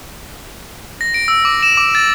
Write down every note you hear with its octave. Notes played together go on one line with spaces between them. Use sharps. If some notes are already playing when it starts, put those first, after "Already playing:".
A#6
D7
E6
D6
E7
D6
A6